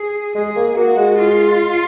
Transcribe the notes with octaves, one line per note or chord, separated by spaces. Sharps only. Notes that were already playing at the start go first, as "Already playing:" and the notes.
Already playing: G#4
G#3 G#4
A#3
A#3 F#4
G#3
F4